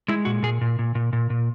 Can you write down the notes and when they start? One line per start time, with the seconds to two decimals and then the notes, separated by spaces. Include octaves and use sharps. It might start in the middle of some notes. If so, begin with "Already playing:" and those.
0.08 G#3 E4
0.25 A#2 F#4
0.43 A#2 G#4
0.61 A#2
0.79 A#2
0.95 A#2
1.13 A#2
1.30 A#2